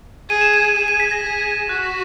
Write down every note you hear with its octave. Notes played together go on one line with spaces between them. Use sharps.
G#4 D#7
E7
D#7
D#7
G#4 E7
D#7
B6
A#6
G#4
F#4 F#6